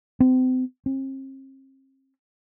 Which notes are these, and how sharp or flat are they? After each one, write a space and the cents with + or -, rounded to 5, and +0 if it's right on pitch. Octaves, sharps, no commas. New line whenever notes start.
C4 -35
C4 +40